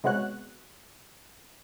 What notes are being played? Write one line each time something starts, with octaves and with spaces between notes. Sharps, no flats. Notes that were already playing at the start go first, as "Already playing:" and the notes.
C3 G#3 B3 F#4 C#5 F#6